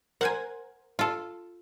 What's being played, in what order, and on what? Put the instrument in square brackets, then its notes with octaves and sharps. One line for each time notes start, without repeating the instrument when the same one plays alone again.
[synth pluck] A#4 C5 G#6 [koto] F#5 G#5
[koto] F4 A4